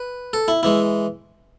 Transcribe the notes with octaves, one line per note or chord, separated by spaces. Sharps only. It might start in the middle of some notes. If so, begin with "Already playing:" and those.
Already playing: B4
A4
E4
E3 G#3 E4